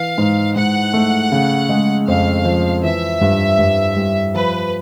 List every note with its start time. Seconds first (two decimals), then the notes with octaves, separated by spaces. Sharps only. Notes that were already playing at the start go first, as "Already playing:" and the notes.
Already playing: E3 F5
0.18 G#2
0.55 G#2 F#5
0.93 A3
1.32 C#3
1.69 G#3
2.07 F2 F5
2.45 F3
2.83 E3 E5
3.21 G2
3.59 G2
3.96 G3
4.34 F3 B4